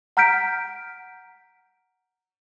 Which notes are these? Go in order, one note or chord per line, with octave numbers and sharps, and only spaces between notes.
F#5 A#5 F6 G6 B6 D7